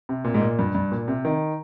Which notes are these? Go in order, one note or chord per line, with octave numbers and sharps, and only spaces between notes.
C3
A#2
G#2
A#2
G2
G2
A#2
C3
D#3